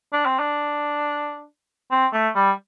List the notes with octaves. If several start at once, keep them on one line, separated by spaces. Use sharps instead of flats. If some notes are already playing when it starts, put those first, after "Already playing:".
D4
C4
D4
C4
A3
G3